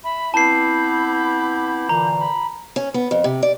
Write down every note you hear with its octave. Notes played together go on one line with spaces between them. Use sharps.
E5 B5
B3 C4 E4 A5 B5 D6 G6 C7
A#2 D3 E3 A#5
B5
C#4
B3
F2
C3
D5